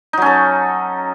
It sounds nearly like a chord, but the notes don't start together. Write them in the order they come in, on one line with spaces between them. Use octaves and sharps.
D#4 F#3 C#4 A4